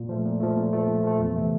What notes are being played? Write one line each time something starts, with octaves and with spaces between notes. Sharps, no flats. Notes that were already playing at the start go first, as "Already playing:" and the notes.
Already playing: A#2
F3 A3
A#2
F3 A3
A#2
F3 A3
A#2
F3 A3
E2
C3 E3 A3